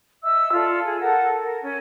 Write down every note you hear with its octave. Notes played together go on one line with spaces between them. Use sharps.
D#5 E5 E6
F4 A4 D5
G#4
A4 A#4 F#5
A#4
C#4